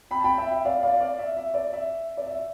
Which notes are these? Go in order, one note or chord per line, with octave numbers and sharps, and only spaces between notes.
G5 B5
A5
G5 B5
E5 G5
E5
D5 F5
D5 F5
D5 F5
E5
E5
D5
E5
D5
E5